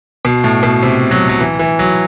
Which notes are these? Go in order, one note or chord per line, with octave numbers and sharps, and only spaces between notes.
B2
A2
B2
C3
F#3
F#3
E3
E3
F#3